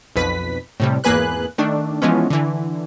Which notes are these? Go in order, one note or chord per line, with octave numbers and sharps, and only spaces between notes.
B1 F2 B4 B6
A2 C3 G3
G#1 E2 A#3 G#4 B4 F#6
D#3 A3 D4
E3 F3 G#3 B3 C#4
D3 E3